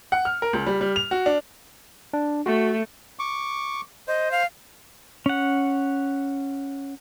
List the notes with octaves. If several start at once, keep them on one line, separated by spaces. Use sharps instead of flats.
F#5
F6
A#4
C#2
G3
G3
F7
F#4
D4
D4
A3 F#4
C#6 D6
C5 D#5
F5
C#4 F#5